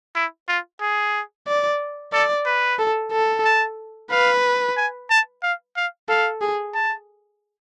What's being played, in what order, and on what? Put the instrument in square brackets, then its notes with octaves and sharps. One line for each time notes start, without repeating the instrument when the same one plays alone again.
[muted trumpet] E4
F4
G#4
[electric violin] D5
[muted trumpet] A4 [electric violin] D5
[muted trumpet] B4
[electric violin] A4
A4
[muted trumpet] A5
[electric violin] B4 [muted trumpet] F5
[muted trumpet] G#5
A5
F5
F5
[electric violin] A4 [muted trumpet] F5
[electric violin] G#4
[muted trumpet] A5